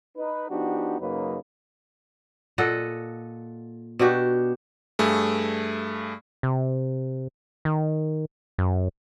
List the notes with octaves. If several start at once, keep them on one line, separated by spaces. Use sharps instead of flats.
D#4 B4
F3 B3 D4 D#4 F#4 G4
F#2 C#3 F#3 A#3 D#4 B4
A#2 A4 D#5 F#5
B2 D4 F#4 G4
G2 A3 G#4
C3
D#3
F#2